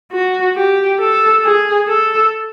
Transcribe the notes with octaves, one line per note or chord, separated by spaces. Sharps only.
F#4
G4
A4
G#4
A4